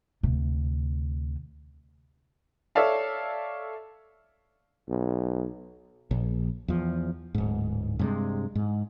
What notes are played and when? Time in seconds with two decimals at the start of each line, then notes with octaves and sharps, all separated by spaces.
0.23 D2 C3
2.75 A4 C#5 D5 E5 F5 A5
4.89 B1
6.11 A#1
6.68 E2 F3
7.35 D1 G#2
7.99 G2 C3 G#3
8.55 G#2